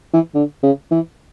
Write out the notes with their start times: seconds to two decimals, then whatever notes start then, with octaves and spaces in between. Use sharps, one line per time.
0.13 E3
0.35 D3
0.63 C#3
0.91 E3